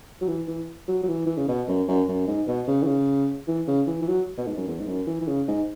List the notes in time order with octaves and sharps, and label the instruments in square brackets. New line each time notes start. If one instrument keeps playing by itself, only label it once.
[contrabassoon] F#3
E3
E3
F#3
F#3
E3
E3
C#3
B2
F#2
F#2
F#2
G#2
B2
C#3
E3
C#3
E3
C#3
E3
E3
F#3
B2
G#2
F#2
E2
G#2
F#2
E3
E3
C#3
G#2